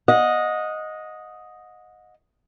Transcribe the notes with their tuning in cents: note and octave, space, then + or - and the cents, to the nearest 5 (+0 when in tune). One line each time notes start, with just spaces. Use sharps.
D#5 +0 F#5 -35